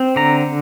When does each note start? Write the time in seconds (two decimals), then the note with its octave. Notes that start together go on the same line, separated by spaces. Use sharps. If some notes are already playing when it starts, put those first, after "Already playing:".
Already playing: C4
0.16 D3 A#5